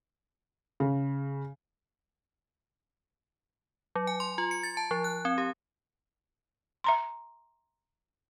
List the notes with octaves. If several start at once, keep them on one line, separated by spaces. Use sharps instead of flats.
C#3
F#3
G#5
C6
F4
C#7
A6
A5
F3
F#6
C4
G4
E5 A#5 C6